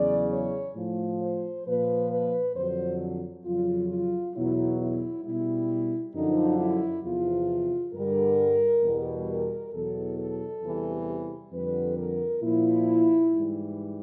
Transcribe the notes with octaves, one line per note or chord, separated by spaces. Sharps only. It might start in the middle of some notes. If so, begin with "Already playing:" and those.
Already playing: E2 C#3 F#3 D5
C#5
A2 F3
C5
A#2 F3 B4
B4
F2 D3 F#3 C5
F2 C#3 F#3 F4
F4
E2 B2 F#3 E4
E4
B2 G3 E4
F#2 D3 F3 D#4
E4
E2 C3 F3 F4
G2 D3 G3 A#4
E2 B2 G3
A#4
E2 B2 F#3 A4
A4
E2 C3 E3 G3
F2 D3 G3 B4
A#4
A#2 F3 E4
G#2 E3 G3